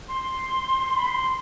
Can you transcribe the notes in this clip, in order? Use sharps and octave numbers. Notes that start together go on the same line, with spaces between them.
C6
B5
C6